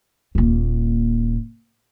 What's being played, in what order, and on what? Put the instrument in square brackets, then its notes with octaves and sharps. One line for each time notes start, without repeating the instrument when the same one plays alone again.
[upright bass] D#1 A#2